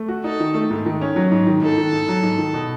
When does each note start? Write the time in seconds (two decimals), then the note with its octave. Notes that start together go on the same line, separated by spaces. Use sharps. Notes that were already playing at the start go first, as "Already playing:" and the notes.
Already playing: A3
0.08 F#4
0.24 D#4 A4
0.40 D#3
0.54 A3
0.70 G#2
0.86 D#3
1.01 C#4
1.16 F#3
1.32 G#2
1.47 D#3
1.62 G#2 A4
1.77 D#3
1.92 G#2
2.08 F#3
2.23 G#2
2.38 D#3
2.54 B2